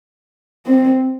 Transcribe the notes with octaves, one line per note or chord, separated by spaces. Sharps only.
C4